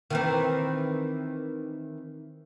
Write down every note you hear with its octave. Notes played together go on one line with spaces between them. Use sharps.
D#3 E3 C4